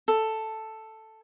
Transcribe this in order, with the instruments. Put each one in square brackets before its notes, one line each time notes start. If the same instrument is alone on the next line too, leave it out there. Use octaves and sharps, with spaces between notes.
[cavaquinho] A4